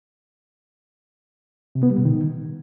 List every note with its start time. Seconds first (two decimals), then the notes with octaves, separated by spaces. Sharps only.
1.75 C3
1.83 B3
1.90 G3
1.98 B2
2.05 D#3